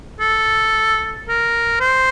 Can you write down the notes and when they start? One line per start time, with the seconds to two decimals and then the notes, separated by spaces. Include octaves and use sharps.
0.20 A4
1.28 A#4
1.80 C5